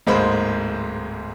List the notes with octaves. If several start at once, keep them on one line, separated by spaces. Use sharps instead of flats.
D1 G#2 G#3 A#3 C5 B5